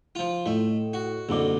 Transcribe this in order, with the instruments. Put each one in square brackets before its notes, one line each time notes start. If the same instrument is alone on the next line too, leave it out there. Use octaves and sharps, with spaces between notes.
[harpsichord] F3 F4
[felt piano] A2 D#5 [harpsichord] A3
[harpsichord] F#4
[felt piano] F#1 D3 D6 [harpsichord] C2 B2